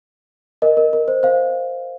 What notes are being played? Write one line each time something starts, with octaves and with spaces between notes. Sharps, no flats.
A#4 D#5
A#4
A#4
C5
C5 F5